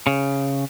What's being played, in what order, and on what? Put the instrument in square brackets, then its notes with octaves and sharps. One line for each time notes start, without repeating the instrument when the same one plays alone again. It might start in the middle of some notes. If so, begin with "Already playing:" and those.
[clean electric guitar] C#3